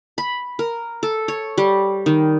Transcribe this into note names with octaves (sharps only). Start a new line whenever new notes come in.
B5
A#4
A4
C#5
G3
D#3